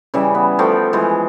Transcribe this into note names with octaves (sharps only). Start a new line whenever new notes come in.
C#3 E3 G3 E5
B3
F3 A3 G5
E3 F3 G#3